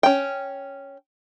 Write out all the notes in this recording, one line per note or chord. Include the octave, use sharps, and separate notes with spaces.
C#4 G5